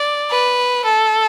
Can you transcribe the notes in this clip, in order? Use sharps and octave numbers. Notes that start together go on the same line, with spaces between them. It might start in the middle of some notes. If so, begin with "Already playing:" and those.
Already playing: D5
B4
A4